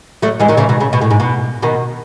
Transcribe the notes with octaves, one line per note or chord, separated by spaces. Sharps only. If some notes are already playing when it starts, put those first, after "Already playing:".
F#3 A3
E3 G#3
D#3 F#3
C#3 E3
B2 D#3
C#3
B2
A2
G#2
B2
B2 D#3